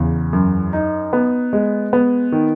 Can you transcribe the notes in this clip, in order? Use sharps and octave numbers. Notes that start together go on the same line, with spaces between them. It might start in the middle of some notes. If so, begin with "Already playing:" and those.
Already playing: E2 C#3
F#2
D#4
B3
G#3
B3
D#3